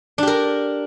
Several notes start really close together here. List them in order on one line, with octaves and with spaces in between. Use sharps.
D4 G4 A#4